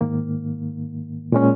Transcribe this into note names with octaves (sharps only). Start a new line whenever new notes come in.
G#2 D#3 A#3
A#2 G#3 C#4